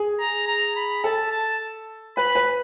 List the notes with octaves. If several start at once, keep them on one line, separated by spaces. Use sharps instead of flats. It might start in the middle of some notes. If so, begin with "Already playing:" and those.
Already playing: G#4
A#5
A#5
B5
A4 A5
A5
B4 B5
B4